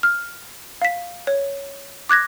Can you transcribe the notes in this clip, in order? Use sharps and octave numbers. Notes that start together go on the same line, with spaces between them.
F6
F5 B6
C#5
D6 F#6 G#6 A#6